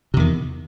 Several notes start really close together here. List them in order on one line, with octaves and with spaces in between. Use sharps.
C3 E2 D#3